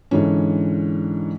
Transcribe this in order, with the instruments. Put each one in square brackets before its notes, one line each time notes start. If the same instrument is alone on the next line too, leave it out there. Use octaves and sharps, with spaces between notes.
[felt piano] G#2 D3 E3 C#4